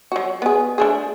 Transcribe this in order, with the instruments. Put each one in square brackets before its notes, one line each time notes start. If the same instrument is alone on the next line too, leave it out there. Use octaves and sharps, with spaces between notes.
[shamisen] F#3 F#4
B3 G#4
A3 D4 G#4